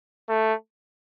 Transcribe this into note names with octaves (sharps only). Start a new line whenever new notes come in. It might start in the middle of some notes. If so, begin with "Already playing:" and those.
A3